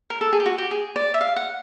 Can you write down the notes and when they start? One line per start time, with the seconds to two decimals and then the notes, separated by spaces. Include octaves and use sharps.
0.10 A#4
0.21 A4
0.33 G#4
0.40 G4
0.46 F#4
0.58 G4
0.71 G#4
0.96 D5
1.14 E5
1.21 F5
1.36 F#5